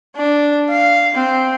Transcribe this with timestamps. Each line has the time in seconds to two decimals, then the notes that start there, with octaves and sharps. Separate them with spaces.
0.16 D4
0.70 F5
1.14 C4